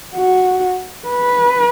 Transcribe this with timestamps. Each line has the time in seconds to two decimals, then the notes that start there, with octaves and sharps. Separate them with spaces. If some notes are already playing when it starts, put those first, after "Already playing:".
0.16 F#4
1.08 B4